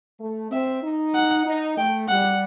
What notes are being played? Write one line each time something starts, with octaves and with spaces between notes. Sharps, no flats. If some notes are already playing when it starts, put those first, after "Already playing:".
A3
C4 E5
D#4
F#5
D#4
A3 G5
G3 F#5